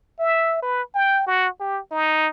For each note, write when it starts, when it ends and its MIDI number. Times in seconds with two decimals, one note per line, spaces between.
0.19 0.58 76
0.62 0.82 71
0.94 1.23 79
1.27 1.48 66
1.60 1.79 67
1.91 2.28 63